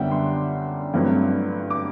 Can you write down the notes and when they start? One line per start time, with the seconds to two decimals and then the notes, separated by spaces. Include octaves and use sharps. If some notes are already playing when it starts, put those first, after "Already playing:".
Already playing: F#2 D3 G3 B3 D4 E5 F#5 G5
0.11 C6
0.93 G2 F#3 A3 C4 E4
1.70 D6